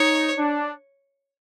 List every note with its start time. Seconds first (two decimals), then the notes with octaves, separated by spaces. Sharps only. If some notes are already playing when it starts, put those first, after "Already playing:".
Already playing: D#4 C#5
0.38 D4